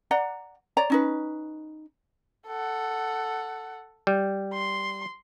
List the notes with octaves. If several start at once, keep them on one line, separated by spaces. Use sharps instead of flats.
D5 F#5 A#5
C#5 D5 A#5
C#4 D#4 B4
A4 F#5
G3
C6